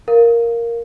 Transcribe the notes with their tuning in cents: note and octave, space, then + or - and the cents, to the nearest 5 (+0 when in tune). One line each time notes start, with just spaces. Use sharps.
A#4 +0 F5 +0